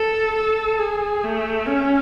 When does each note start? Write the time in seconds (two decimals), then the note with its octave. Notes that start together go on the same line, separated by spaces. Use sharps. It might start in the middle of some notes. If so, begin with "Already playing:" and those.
Already playing: A4
0.35 A4
0.79 G#4
1.23 A3
1.66 C#4